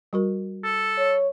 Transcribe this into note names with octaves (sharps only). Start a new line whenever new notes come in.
G3 F#4 A#4
A4
C#5